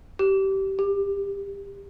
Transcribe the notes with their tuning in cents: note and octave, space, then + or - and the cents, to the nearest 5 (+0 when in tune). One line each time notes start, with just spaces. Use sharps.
G4 -20
G4 +25